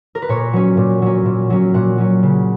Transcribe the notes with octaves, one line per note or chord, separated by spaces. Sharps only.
A#4
B4
A#2 C#5
F#3 C#4
A#2
F#3 C#4
A#2
F#3 C#4
A#2 F#5
F#3 C#4
C#3